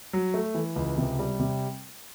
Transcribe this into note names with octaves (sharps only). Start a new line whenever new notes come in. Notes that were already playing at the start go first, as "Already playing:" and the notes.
F#3
A3
E3
C#2
C3
G3
C3